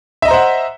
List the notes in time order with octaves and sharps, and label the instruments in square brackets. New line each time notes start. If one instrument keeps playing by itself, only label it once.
[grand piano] E5
D#5
A#5
C5
F#5